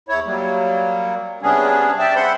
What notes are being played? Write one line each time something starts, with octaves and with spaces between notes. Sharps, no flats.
E2 E4 C#5
F#3 G3 A#3
C3 G3 B3 C#4 D4 G#4
D5 E5 G5 A5
C5 E5 F#5 B5 C6